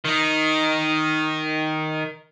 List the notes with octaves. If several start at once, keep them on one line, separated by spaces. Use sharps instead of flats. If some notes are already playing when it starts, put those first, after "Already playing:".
D#3 D#4